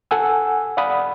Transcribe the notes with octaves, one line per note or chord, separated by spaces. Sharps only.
A4 F#5 G#5 E6
D5 F5 F#5 B5 D#6